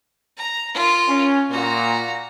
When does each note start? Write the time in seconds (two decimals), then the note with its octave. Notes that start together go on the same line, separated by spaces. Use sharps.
0.38 A#5
0.74 F4 A#4
1.08 C#4
1.51 A#2 F#4 A#5